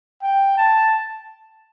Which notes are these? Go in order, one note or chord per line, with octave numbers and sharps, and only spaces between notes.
G5
A5